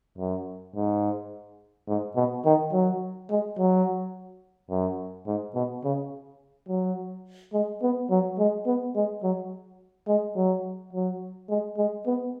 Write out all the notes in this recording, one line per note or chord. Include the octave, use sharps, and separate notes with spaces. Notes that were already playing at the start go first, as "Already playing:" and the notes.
F#2
G#2
G#2
B2
D#3
F#3
G#3
F#3
F#2
G#2
B2
C#3
F#3
G#3
B3
F#3
G#3
B3
G#3
F#3
G#3
F#3
F#3
G#3
G#3
B3